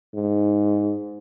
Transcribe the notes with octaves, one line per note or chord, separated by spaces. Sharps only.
G#2